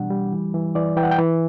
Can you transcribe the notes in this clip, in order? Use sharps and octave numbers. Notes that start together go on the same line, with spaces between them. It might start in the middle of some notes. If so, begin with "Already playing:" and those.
Already playing: B2 E3 G3 D4 F#5
G3
E3
E3
E3 D5
E3 G5
F#5
G5
E3